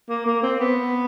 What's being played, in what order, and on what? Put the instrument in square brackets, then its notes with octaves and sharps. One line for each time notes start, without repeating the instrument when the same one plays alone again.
[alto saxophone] A#3
A#3
C4
B3